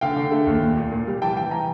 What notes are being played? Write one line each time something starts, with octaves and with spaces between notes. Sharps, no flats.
D3 F5 G5
D3
A3
D#2
A#2
A#2
A#2
G3
E3 G5 A5
E3 G5 A5
E3 G#5 A#5